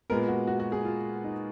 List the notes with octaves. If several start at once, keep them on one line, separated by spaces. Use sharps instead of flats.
A#2 G#3 B3 A#4
F#4
F#4
F#4
G#4
F4
D#4